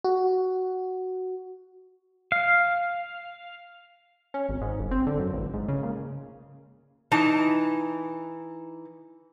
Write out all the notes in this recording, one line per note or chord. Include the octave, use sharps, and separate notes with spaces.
F#4
F5
C#4
G#1
G#2
G1
C4
D3
F#2
A1
G#2
C#3
A#2
E3 D#4 A5